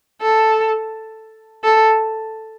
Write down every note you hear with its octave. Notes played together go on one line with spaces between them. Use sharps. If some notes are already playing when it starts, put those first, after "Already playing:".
A4
A4